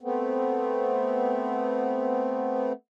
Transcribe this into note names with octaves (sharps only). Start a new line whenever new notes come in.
A3 B3 C4